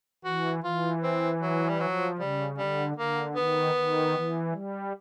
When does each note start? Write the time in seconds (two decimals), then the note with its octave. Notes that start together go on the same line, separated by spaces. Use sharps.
0.25 E3 F#4
0.64 E3 F4
1.03 C4
1.41 F#3
1.69 G3
1.81 F3 F#3
2.19 C#3 G3
2.58 D3 G3
2.97 D3 A#3
3.35 D#3 B3
3.75 D#3
4.13 E3
4.52 G3